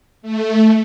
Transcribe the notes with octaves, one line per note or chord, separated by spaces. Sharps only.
A3